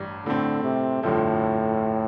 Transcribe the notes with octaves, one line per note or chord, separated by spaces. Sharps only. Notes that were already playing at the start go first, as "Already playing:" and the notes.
Already playing: A1 G2 G3
A2 D3 A3 C4
C3
G1 F2 A2 D3 F3